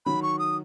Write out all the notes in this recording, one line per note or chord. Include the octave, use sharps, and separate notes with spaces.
D#3 F#3 B5
C#6
D#6